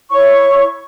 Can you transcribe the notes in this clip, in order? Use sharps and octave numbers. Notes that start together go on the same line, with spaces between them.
E4 C#5 C#6